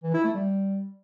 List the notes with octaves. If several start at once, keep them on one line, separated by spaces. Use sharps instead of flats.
E3
E4
A3
G3